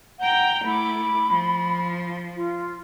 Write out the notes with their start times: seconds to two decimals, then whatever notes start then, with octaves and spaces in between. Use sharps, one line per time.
0.19 F#5 G5 A#5 G6
0.65 A3 E4 B5 D6
1.30 F3
2.36 F4